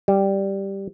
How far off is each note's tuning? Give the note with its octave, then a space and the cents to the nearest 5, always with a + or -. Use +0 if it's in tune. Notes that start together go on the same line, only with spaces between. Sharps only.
G3 +0